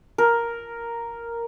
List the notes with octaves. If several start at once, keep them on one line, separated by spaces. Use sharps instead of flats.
A#4